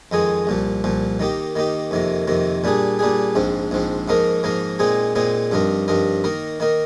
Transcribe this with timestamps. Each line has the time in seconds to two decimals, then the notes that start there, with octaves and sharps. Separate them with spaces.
0.12 F2 D#3 G#3 D#4 G#4
0.47 C2 A#2 F3
0.84 C2 A#2 F3
1.20 D#3 A#3 D#4 G4
1.56 D#3 A#3 D#4 G4
1.91 F2 C3 D#3 A#3
2.27 F2 C3 D#3 A#3
2.64 A#2 G3 D4 G#4
2.99 A#2 G3 D4 G#4
3.35 A#1 G#2 F3 C4
3.71 A#1 G#2 F3 C4
4.08 G#2 F3 A#3 D#4 A#4
4.43 G#2 F3 A#3 D#4 A#4
4.79 A#2 G#3 C4 D#4 G#4
5.15 A#2 G#3 C4 D#4 G#4
5.51 G2 F3 C4 D#4 A#4
5.88 G2 F3 C4 D#4 A#4
6.24 D#3 A#3 D#4 A#4
6.60 D#3 A#3 D#4 A#4